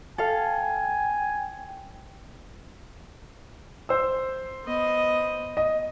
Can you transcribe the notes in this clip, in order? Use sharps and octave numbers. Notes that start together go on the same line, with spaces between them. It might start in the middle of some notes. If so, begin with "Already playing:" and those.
A4 F5 G5 G#5
C5 E6
B3 D#5
D#5